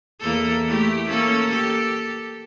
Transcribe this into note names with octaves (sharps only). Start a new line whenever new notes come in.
E2 A#3 A4
A3 E4 G4
A#3 C#4 A4
G4 A4